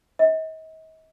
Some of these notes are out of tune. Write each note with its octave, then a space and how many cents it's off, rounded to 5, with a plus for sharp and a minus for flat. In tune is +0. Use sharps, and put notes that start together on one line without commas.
D#5 +45